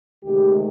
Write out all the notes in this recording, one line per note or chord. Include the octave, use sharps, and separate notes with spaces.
D2 C3 D#3 G#3 G4